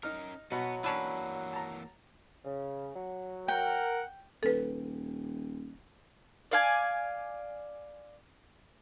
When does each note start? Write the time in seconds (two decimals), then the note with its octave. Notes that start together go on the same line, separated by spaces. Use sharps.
0.03 C#4 D#4 A#4 F6
0.52 B2 F#3 B3
0.84 E3 A#3 C#4 D4 B4 E6
1.53 A5 A#5
2.45 C#3
2.95 F#3
3.48 A#4 F#5 G5
4.43 D#1 A4 B4
6.51 D5 F5 G#5